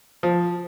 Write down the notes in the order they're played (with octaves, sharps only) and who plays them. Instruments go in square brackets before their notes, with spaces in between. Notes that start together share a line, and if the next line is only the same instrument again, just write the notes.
[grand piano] F3